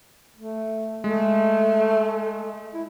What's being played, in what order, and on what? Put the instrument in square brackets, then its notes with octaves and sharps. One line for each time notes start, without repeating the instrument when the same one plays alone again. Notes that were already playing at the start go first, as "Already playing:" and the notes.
[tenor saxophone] A3
[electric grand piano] G#3 [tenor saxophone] A3
[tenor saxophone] E4